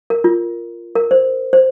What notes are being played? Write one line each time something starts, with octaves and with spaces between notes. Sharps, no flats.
A#4
F4
A#4
C5
C5